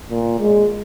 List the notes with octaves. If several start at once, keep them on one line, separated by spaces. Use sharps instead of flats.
A#2
G#3